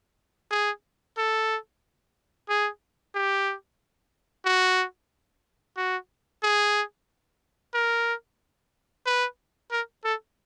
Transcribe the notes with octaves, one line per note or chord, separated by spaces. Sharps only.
G#4
A4
G#4
G4
F#4
F#4
G#4
A#4
B4
A#4
A4